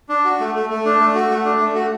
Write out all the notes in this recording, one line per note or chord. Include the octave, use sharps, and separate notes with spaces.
D4
F#4
A3
A3
A3
D4
A3
F#4
A3
D4
A3
F#4